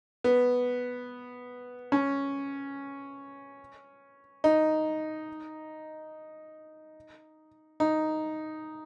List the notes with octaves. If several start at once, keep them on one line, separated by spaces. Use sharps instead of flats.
B3
C#4
D#4
D#4